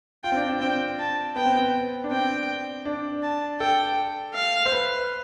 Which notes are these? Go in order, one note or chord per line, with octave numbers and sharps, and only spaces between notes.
F4 G5
C4
D4
C4
C4 G5
A5
B3 G5
C4
B3
D4
C4 G5
D4
A5
A4 G5
F5
C5
B4